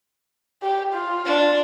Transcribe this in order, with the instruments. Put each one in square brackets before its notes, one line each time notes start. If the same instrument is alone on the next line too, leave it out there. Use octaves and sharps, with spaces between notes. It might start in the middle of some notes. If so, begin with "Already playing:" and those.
[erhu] G4
F4
[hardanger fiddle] D4